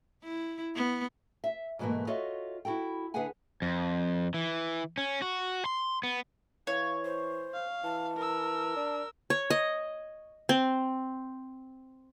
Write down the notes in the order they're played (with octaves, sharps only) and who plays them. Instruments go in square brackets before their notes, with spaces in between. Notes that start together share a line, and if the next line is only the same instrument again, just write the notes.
[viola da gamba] E4
B3
[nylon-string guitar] E5
G#2 B2 E3 F3 A3 A#3
F4 F#4 A4 C#5 D#5 E5
E4 F#4 A4 G5
D3 G#4 B4 E5 F#5 G#5
[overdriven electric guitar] F2
E3
C#4
F#4
C6
B3
[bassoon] E3 [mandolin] C#5 [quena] F5
[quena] C5
[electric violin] F5
[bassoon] E3 [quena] A5
[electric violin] A#4 E6
[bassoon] D4
[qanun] C#5
D#5
C4